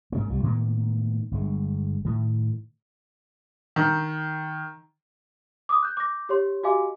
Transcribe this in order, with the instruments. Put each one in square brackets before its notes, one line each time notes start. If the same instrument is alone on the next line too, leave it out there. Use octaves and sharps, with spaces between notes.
[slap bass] G#2 C#3 A#3
C2 F3 G3
A2 D#3 A#3 B3
G1 G#3
A2 D#3
[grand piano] D#3
[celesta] D6 D#6
F#6 G6
D6 G6 A#6
G4 C#5 C6
F#4 G4 D#5 F5 G#5 D6